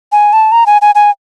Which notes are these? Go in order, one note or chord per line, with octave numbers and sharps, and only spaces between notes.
G#5
A5
A#5
G#5
G#5
G#5